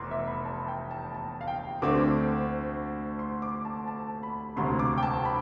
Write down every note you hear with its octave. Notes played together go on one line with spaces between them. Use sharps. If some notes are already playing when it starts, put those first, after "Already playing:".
Already playing: F1 E2 C6 D6
E5
B5
A5
G5
A5
A5
F5
G5
D2 D3 A3 C4 D6
C6
D6
A5
A5
B5
E1 D2 C3 C6
D6
G5
A5
B5